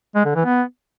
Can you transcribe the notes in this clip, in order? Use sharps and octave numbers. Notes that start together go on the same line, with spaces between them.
G#3
D3
E3
B3